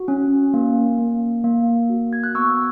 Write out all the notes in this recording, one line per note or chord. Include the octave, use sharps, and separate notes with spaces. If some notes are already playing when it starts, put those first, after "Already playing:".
Already playing: F#4
C#4
A#3
A#3
A#3
F#4
G#6
F#6
B3 C#6 E6